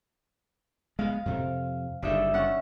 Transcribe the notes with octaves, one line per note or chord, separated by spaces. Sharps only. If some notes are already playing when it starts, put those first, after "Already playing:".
G#3 B3 F5
F2 C3
F#1 D3 G3 D4 D#4 E5
C#4 F#5 C#6